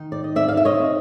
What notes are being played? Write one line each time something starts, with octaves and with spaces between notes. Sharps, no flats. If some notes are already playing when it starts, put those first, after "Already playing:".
Already playing: D#3 D#4
D5
D#5
C4 D5 E5
F5
E5
C#5 D#5
C4